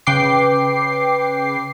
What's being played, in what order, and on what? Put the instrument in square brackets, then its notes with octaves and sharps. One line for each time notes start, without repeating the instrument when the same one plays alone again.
[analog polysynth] C#3 B4 G5 D6 C7